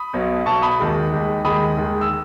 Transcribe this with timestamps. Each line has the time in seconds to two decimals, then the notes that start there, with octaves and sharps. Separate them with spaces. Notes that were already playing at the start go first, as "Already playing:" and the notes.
Already playing: B5 D#6
0.13 B1 B2 F#3
0.46 B1 B2 F#3 A5 C#6
0.62 B5 D#6
0.80 D#2 D#3 G#3
1.12 D#2 D#3 G#3
1.45 D#2 D#3 G#3 B5 D#6
1.77 D#2 D#3 G#3
2.01 E6